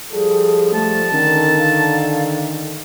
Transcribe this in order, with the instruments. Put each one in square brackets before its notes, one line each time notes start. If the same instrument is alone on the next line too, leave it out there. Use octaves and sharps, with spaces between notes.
[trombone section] F3 G3 A4 [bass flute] G#4
[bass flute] A3 [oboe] A5
[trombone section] D3 D#3 [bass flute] C#4
[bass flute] F5